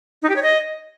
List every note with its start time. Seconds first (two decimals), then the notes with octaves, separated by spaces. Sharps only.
0.23 D#4
0.29 G4
0.36 C#5
0.43 D#5